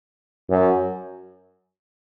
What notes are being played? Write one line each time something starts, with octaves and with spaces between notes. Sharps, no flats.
F#2